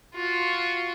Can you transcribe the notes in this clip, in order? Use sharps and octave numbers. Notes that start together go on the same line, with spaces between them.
F4 F#4